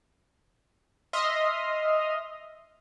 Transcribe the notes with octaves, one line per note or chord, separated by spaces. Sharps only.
D#5 E5 C6 D#6 F6